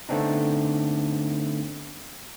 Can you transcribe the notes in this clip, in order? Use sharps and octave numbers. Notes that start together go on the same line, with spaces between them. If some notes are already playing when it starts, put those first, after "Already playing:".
D3 A3 B3 C4 D4 D#4